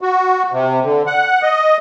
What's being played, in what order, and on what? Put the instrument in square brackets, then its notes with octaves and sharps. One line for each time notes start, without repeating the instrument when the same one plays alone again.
[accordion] F#4
C3
D3
F#5
D#5